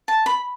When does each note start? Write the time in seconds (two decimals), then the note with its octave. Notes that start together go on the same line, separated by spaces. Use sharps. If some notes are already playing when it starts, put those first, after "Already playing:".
0.08 A5
0.26 B5